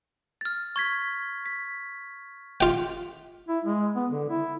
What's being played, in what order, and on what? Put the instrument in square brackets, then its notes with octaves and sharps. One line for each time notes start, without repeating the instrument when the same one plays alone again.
[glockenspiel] F6 A6
C#6 G#6 B6
B6
[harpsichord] F4 G5
[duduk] E4
G#3
B3
D3
E4